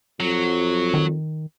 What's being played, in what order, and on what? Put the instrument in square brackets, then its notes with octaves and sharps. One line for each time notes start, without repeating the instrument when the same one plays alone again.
[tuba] F2 [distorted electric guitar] F#3
[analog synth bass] D#3